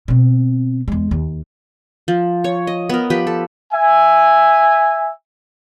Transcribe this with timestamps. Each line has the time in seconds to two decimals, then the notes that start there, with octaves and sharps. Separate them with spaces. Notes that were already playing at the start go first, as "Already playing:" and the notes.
0.08 B2 C4
0.88 E2 G#3
1.11 D#2
2.08 F3
2.44 C#5
2.67 D#5
2.89 B3 A#4
3.10 F3 G4 B4
3.27 A4
3.73 E5 G#5